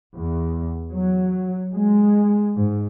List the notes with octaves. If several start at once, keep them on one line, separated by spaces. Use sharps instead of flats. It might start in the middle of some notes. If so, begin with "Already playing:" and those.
E2
F#3
G#3
G#2